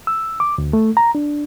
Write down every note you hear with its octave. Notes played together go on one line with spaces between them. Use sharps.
E6
D6
D2
A3
A#5
D4